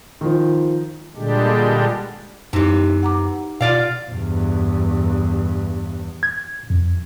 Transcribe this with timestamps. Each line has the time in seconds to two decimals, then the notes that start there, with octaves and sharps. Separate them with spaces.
0.21 D#3 F3
1.16 A#2 D3 G3 G#3 D4 G4
2.53 F#2 C3 E3 G3 B3 D#4 G4
3.03 F#5 A#5 D6
3.61 B2 F4 D5 F5
4.10 E2 G2
6.23 G#6
6.70 F2